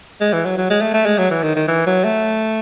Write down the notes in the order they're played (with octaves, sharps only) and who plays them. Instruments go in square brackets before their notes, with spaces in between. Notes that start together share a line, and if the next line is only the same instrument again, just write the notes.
[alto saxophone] G#3
E3
F#3
F#3
G#3
A3
A3
G#3
F#3
E3
D#3
D#3
E3
F#3
A3